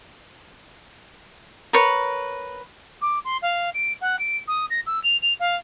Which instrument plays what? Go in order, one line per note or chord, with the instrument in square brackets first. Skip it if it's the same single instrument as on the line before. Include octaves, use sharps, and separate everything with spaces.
[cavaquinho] A#4 B4 C#5
[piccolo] D6
C6
F5
D7
F#5
D7
D#6
A#6
E6
F7
F7
F5